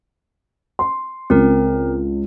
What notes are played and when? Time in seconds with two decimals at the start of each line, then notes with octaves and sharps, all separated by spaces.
0.79 C6
1.30 C#2 C4 A#4